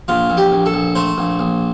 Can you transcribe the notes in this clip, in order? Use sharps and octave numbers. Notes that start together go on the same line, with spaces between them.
A#1 F4
A#1
G4
A#1
A4
A#1
A3 C5
A#1
A#1